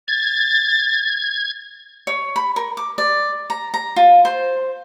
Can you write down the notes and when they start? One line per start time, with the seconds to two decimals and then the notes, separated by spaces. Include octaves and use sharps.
0.08 G#6 A6
2.07 C#5
2.36 B5
2.56 A#4
2.77 D6
2.98 D5
3.50 A#5
3.74 A#5
3.96 F4
4.25 C5